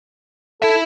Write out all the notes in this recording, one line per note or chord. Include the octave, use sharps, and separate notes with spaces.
E4 A4 E5